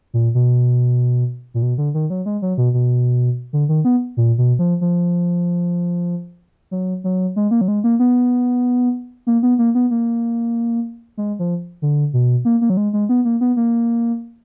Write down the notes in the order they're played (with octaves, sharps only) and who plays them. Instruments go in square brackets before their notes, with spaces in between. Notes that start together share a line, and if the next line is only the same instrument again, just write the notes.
[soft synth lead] A#2
B2
A#2
B2
D3
D#3
F#3
G#3
F#3
B2
B2
D3
D#3
B3
A#2
B2
F3
F3
F#3
F#3
G#3
A#3
F#3
G#3
A#3
B3
A#3
B3
A#3
B3
A#3
G#3
F3
D3
B2
A#3
A#3
F#3
G#3
G#3
B3
A#3
B3
A#3